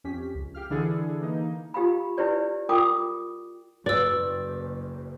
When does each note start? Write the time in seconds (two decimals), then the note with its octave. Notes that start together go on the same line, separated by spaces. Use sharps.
0.04 F2 C#4 G4 B6
0.34 C#2
0.55 G4 F5 F6
0.70 D3 E3 D4 E4 G#4 A4
1.21 E3 A#3 D#4
1.74 F4 G4 F5 B5
2.18 E4 G4 B4 C#5 D5
2.69 F4 A#4 G5 D6 D#6
3.86 F#1 B4 D5 E6